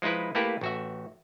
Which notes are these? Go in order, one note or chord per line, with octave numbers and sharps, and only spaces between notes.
F3 G#3 D#4 E4 B4
A3 A#3 E4 G4 B4
A1 F#4 E5